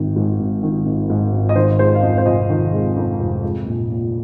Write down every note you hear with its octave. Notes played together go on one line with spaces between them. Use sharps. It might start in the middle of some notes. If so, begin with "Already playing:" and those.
Already playing: G#1 D#3
G#2
G#1
D#3
G#1
G#2
G#1
D#5
D#3 C5
G#3 C5
F5
F2 D#5
C5
F1 D#5
D#3
G#3
F2
F1
G#3
A#1
A#2